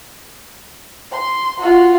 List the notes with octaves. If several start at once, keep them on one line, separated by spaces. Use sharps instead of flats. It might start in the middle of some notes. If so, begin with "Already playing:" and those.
C6
F4 F#4